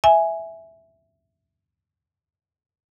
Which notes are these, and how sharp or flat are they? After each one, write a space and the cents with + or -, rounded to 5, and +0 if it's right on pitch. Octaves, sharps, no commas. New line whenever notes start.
E5 +0 G#5 +0